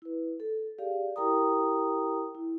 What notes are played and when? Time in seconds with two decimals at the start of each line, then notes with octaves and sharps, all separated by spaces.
0.02 E4 B4
0.40 A4
0.79 G4 G#4 D5 F5
1.16 E4 G4 A#4 G5 A#5 D#6
2.35 E4